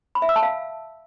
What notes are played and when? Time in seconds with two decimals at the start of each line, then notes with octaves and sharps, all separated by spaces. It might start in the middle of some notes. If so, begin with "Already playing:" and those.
0.15 B5
0.22 E5
0.29 E6
0.36 A5
0.43 F5